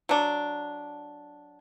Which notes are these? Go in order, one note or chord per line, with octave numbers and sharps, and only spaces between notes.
F#3 D4